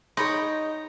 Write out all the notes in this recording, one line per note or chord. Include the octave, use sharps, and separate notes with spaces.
D#4 G#4 C#5 D#5 G5 B5 C6